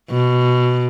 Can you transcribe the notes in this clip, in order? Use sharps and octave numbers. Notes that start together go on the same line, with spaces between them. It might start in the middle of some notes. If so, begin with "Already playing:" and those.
B2